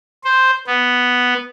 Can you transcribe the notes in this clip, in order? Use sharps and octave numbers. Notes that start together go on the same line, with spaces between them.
C5
B3